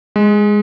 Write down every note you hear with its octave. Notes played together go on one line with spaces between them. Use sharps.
G#3